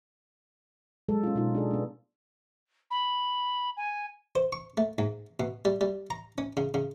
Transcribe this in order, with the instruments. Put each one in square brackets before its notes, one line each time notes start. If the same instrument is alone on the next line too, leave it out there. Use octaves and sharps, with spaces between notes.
[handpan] F#3 G#3 A4
C#4 F4
B2 C#4 D#4 F4
D4 G#4 A4
B3 D4
[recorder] B5
G#5
[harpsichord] C5
C#6
A3
G#2
B2
G3
G3
A#5
C#4
C#3
C#3